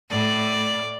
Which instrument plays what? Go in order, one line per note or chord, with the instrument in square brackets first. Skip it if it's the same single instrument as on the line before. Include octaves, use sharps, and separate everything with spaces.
[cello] A2 [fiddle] D5